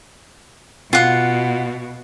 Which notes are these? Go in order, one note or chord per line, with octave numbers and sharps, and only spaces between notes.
B2 F4 F#5